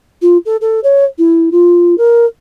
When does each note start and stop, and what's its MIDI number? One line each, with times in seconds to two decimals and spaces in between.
0.21 0.37 65
0.45 0.56 69
0.61 0.80 69
0.83 1.04 73
1.18 1.49 64
1.51 1.95 65
1.97 2.25 70